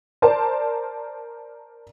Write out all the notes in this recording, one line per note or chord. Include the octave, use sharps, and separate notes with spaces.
A#4 C5 D5 A5